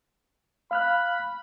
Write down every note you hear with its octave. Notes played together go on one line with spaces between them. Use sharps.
F5 B5 F6 F#6